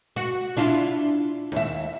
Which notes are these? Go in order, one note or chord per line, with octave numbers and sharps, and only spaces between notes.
F#4
D4 E4 F4
D#2 E5